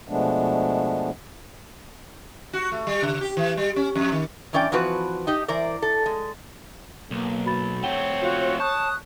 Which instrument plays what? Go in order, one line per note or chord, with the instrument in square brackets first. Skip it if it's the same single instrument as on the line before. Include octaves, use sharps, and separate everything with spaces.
[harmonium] B2 F3 G#3 A3 B3 D4
[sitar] F#4
A3
G3
C#3
G4
E3
G3
C#4
F2
D#3
[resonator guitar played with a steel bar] G2 E3 C#4 D5 G5
E3 F3 C4 F#4 B4
D#4 G4 D#5
E3 A#4 C5 D5
A4
G#3
[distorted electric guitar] B1 [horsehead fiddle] A#3
[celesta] F#4 B5 A6
[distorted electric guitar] A3 C4 [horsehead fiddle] C#5 [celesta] F#5 G5 G7
[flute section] F4 F#4
[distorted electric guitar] A5 [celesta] C#6 G6 [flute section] D#6 F#6